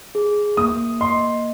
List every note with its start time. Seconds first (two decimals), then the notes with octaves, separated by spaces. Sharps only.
0.15 G#4
0.57 A#3 D#6
1.01 D#5 C6